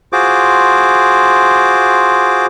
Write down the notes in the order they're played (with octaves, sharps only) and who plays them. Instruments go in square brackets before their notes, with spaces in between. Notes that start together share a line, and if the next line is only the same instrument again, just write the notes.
[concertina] F4 F#4 G#4 C5 D6